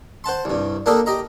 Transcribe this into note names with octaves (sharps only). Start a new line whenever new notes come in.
C5 F#5 A5 C6
C2 G2
A#3 D4 G4 A4 D#5
G4 D#5 A#5